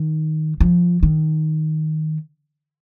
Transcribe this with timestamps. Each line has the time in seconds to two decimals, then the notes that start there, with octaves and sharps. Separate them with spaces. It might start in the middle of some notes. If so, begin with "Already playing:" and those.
Already playing: D#3
0.60 F3
1.03 D#3